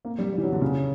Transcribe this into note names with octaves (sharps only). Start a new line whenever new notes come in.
A#3
G3
G3
E3
F#3
D3
C#3